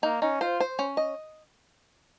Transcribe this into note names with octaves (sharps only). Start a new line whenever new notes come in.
A#3 D#4
C#4 D#4
F4 C5
C5
C#4
D#5